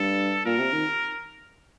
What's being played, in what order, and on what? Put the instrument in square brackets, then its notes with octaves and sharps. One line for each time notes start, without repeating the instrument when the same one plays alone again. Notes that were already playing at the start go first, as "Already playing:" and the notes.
Already playing: [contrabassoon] G2 [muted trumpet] A4
[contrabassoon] A#2 [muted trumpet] A#4
[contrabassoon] C3
D#3